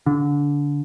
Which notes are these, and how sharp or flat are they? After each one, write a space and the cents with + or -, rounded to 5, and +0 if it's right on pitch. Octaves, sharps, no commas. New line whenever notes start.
D3 -25